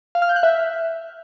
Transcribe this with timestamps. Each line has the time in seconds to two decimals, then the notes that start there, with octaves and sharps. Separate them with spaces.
0.15 F5
0.22 F6
0.29 G6
0.36 F#6
0.43 E5